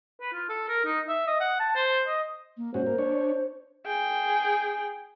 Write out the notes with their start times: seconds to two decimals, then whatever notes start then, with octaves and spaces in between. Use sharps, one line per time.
0.21 B4
0.32 F4
0.49 A4
0.68 A#4
0.85 D#4
1.09 E5
1.27 D#5
1.40 F#5
1.59 A5
1.75 C5
2.07 D#5
2.57 A#3
2.74 G#2 C#4 F#4 C5
2.86 A#3
2.98 D4 C#5
3.87 G#4 G5